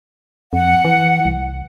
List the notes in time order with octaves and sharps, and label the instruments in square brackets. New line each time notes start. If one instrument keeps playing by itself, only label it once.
[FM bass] F2 [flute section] F#5
[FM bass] E3
C2